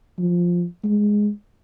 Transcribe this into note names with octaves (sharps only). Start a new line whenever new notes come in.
F3
G#3